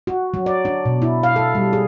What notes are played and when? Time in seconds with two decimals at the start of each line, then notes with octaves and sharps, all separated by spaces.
0.07 F#4
0.34 F#3
0.46 D5
0.65 D4
0.85 B2
1.02 E4
1.23 F5
1.36 A4
1.55 G3
1.73 G#4